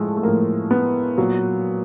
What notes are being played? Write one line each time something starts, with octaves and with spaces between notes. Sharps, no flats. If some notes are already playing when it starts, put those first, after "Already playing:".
Already playing: A2 F3 G#3 A3
A3
A2 F3 A#3
B3
A#2 F#3